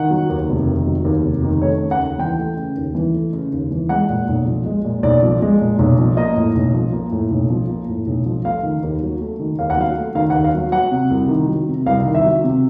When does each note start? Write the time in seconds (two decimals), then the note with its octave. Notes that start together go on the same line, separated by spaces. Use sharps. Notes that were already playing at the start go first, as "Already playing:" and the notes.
Already playing: D#3 F#5
0.10 F#3
0.29 D#2
0.49 F1
0.67 D#3
0.87 F#3
1.05 D#2
1.24 F1
1.43 D#3
1.62 A3 C#5
1.81 C#3
1.91 F#5
2.00 D#2
2.18 E3 G5
2.38 A3
2.57 C#3
2.76 D#2
2.95 E3
3.14 A3
3.33 C#3
3.52 D#2
3.71 E3
3.89 G#3 F#5
4.09 A#2
4.28 B1
4.46 F3
4.66 G#3
4.85 A#2
5.03 B1 D5
5.23 F3
5.42 G#3
5.61 A#2
5.79 B1
5.98 F3
6.17 A#3 D#5
6.36 A2
6.55 B1
6.74 F3
6.93 A#3
7.12 A2
7.30 B1
7.50 F3
7.70 A#3
7.89 A2
8.07 B1
8.26 F3
8.45 A3 F5
8.63 D#3
8.83 D#2
9.02 F#3
9.21 A3
9.39 D#3
9.59 D#2 F5
9.70 F#5
9.77 F#3 F5
9.97 A3
10.15 D#3 F5
10.30 F#5
10.35 D#2
10.44 F5
10.54 F#3
10.72 F#3 F#5
10.91 C3
11.10 C2
11.29 D#3
11.48 F#3
11.68 C3
11.86 C2 F5
12.05 D#3
12.15 E5
12.24 F#3
12.44 C3